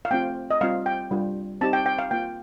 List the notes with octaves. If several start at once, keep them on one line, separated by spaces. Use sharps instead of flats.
F5
A3 C4 F4 G5
D#5
G3 C4 F4 F5
G5
G3 D4 F4
C4 D#4 G4 A5
G5
G5
F5
A#3 F4 G5